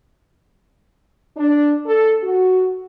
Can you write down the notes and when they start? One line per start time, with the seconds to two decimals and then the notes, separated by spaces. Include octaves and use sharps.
1.37 D4
1.86 A4
2.22 F#4